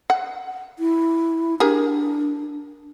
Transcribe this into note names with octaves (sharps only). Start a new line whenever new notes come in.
F#5
E4
D4 G4 G#4 A#4